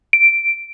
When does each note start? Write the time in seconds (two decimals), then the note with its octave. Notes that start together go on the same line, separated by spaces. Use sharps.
0.13 D7